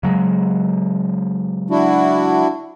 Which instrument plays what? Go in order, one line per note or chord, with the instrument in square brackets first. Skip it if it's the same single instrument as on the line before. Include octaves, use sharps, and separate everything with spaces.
[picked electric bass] C#3 F#3 G#3
[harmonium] D4 E4 F#4